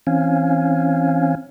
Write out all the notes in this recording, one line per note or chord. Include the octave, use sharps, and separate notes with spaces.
E3 C4 C#4 F5 G#5